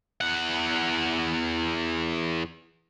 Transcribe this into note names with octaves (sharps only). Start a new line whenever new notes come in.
E2 F#5